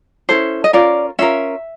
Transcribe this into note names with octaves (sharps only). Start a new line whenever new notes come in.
C#4 E4 A4 C5
D#5
C#4 F4 A#4 D5
C#4 F4 A#4 E5